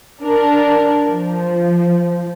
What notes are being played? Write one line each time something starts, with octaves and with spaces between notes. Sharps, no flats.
D4 A#4
F3